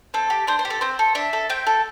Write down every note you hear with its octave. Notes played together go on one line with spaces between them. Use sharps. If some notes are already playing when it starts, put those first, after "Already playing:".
C4 A4
G4
D4 C5
C5
G4
A4
C4 C5
A4
D4 E5
A4
C4 G5
A4